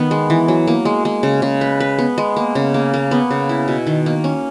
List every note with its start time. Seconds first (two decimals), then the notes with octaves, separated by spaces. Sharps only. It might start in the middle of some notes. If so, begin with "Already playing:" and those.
Already playing: D#3 B3 D#4
0.11 G#3
0.30 E3
0.48 F#3
0.67 A#3
0.85 G#3
1.05 G#3
1.23 C#3
1.42 C#3
1.61 B4
1.80 B4
1.99 B3
2.18 G#3
2.37 A#3
2.55 C#3
2.74 A#3
2.94 A#3
3.11 B3
3.30 C#3
3.49 E4
3.68 B2
3.87 D#3
4.06 A#3
4.24 C#4